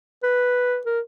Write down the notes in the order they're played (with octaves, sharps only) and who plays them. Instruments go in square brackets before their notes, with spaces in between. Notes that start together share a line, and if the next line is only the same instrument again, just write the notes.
[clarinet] B4
A#4